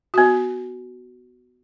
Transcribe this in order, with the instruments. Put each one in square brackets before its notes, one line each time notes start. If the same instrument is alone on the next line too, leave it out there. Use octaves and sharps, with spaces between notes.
[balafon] B3 F#4